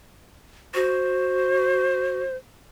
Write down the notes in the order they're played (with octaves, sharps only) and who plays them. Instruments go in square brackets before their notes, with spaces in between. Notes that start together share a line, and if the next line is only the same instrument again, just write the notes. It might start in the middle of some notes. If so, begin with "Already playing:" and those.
[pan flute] F#4 [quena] C5